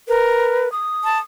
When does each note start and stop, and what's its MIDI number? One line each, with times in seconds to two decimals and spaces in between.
0.08 0.67 70
0.08 0.71 71
0.72 1.21 87
1.04 1.18 81